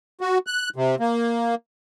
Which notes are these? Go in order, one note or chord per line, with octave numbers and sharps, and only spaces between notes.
F#4
F#6
C3
A#3